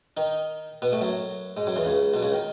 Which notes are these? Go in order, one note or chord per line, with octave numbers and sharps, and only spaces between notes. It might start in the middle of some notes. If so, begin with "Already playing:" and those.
D#3 D#4
B2 B3
A2 A3
F#2 F#3
G#2 G#3
F#2 F#3
E2 E3
C#2 C#3
B1 B2
C#2 C#3
D#3